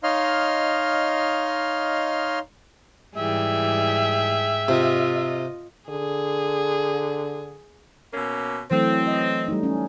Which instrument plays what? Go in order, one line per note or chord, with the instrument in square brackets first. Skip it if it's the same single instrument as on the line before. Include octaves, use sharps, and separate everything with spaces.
[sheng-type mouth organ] D#4 C#5 D#5 F5 C6 F6
[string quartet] G#2 G#4 G5 [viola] E3 G3 [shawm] E5
[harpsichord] C3 [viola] F4 D#5
[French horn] D3 [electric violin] G#4
[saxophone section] B2 A#3 C#4
[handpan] E3 F#3 A3 [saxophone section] C4
[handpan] D#5
G3 A3 D#4
C#4